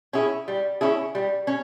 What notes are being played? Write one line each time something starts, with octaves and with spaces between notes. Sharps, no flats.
C#4 E4 G#4
G3
C#4 E4 G#4
G3
C#4